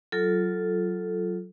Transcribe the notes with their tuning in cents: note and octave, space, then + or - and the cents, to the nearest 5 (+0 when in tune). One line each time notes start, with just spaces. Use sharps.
F#3 +5 F4 +0 A4 -5